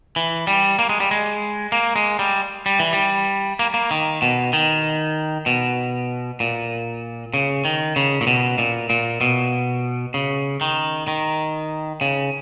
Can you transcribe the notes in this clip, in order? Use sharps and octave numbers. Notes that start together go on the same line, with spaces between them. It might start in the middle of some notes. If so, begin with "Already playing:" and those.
E3
G3
A#3
G#3
G3
G#3
A#3
G#3
G3
G3
E3
G3
A#3
A#3
D#3
B2
D#3
B2
A#2
C#3
D#3
C#3
A#2
B2
A#2
A#2
B2
C#3
D#3
D#3
C#3